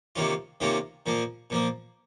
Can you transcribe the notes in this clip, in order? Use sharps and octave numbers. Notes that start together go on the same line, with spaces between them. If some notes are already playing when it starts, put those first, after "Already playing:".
C3 D#3 A#3 C#4 F4
C3 D#3 A#3 C#4 F4
A#2 F3 A#3
A#2 F3 A#3